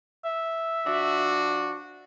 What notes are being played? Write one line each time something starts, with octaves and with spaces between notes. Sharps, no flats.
E5
F3 D4 F#4